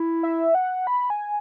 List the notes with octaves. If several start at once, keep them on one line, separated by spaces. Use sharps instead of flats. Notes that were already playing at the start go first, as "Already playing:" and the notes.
Already playing: E4
E5
F#5
B5
G#5